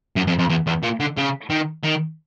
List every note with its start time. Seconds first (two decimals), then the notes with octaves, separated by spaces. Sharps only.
0.16 F#2
0.27 F2
0.39 F2
0.49 E2
0.67 E2
0.83 A#2
1.00 D3
1.17 C#3
1.50 D#3
1.84 D#3